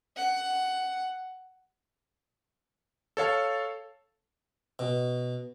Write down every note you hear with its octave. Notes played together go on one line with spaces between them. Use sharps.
F#5
A4 C#5 F5 A5
B2